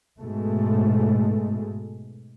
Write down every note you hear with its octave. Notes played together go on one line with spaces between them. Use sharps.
G#2 B2 G#3 A3